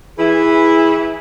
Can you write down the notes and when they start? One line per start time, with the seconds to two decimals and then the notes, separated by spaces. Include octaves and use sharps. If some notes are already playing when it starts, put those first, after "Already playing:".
0.19 E3 E4 G#4